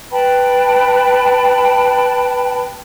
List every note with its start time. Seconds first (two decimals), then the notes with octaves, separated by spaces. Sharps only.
0.11 B4 G5 A5 B5